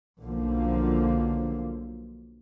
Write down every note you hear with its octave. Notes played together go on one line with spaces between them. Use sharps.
B1 D3 F3 A#3